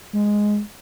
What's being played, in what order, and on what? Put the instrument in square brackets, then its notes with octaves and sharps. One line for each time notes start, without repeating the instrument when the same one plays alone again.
[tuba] G#3